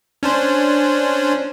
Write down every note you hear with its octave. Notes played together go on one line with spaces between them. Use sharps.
C#4 D4 C5